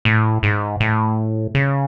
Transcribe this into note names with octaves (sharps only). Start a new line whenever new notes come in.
A2
G#2
A2
C#3